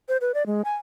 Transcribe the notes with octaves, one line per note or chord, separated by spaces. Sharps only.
C5
B4
D5
G#3
G#5